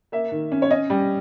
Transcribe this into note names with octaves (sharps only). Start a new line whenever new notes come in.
A#3 E5
D#3
C#4
C#5
C#4 D#5
G3